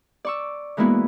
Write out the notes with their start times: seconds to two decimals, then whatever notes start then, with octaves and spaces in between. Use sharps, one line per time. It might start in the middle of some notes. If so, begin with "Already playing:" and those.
0.25 D5 C#6 E6
0.77 E3 G#3 A#3 B3 E4 F#4